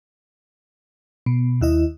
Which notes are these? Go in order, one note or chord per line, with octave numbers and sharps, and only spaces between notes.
B2
D#2 E4 D#5